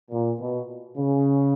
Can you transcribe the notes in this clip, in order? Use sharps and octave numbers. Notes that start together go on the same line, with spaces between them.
A#2
B2
C#3